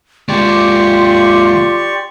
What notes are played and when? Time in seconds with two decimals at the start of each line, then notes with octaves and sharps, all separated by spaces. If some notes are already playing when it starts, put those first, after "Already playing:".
0.29 D#2 G#3 F4 G4 D5 C6 C#6